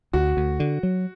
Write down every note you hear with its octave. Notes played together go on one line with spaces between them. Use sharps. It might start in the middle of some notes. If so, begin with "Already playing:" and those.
D2 F#4
D2
D3
F#3